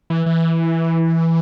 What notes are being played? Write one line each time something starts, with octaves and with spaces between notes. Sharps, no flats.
E3
E3